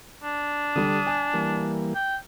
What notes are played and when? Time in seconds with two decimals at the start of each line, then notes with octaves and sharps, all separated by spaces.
0.23 D4
0.76 D3 G3 D#6
1.07 G#5
1.33 E3 G3 A#3
1.95 G5